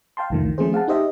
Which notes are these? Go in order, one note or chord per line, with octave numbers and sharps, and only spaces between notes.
F5 G5 A5 C6
C2 F2 D#3 F3 A3
D#3
F3 A3 C4 C#4 G#4 C5
G#4 F5 F#5 A5
D#4 G4 C5 D#5 E5